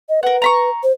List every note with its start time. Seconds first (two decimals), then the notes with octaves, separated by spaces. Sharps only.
0.09 D#5
0.23 A#4 B4 F#5
0.42 A#5 B5 C#6
0.83 C5